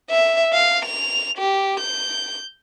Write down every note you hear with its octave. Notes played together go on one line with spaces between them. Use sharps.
E5
F5
F7
G4
G6